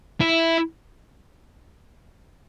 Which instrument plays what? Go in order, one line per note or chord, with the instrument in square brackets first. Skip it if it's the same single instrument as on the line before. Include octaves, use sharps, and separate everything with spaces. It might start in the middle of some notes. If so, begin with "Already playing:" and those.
[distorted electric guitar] E4